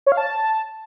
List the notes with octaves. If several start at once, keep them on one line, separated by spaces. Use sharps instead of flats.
C#5
F5
A5